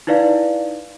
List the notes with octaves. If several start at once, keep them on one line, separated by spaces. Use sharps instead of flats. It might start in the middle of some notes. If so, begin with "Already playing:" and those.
D#4 E4 B4 D5 F5